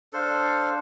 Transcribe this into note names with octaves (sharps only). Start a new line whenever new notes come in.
D4 A4 C5 F5